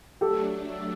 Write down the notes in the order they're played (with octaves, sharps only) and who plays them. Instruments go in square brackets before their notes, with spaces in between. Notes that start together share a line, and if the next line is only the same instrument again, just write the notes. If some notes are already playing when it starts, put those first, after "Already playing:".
[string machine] F#3 A3 D4 [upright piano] G4 A4